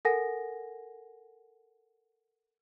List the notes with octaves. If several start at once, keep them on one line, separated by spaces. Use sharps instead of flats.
A4 A#4 F#5 G#5 A#6